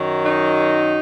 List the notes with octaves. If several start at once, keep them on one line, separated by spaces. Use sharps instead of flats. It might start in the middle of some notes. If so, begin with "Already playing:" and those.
Already playing: F#2 D#3 F#3
D#4